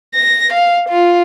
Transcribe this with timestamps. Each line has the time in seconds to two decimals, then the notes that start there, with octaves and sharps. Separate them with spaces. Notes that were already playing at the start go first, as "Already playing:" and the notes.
0.15 A#6
0.53 F5
0.89 F4